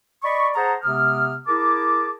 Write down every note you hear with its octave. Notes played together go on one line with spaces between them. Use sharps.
D5 D#5 B5 C#6
G#4 C5 F#5 A5 A#5
C3 G#3 B3 D#6 F6
E4 G#4 A#4 A5 D6